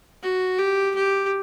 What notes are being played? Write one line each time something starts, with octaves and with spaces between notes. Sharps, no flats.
F#4
G4
G4